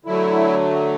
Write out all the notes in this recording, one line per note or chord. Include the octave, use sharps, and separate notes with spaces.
D3 F#3 A3 E4